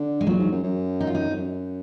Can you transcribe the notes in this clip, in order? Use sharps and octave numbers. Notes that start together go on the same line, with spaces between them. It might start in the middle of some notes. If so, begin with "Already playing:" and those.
Already playing: D3
G#3
A#2 F#3
G#2
F#2
F#2
D#4
F4
D#4
F2
F#2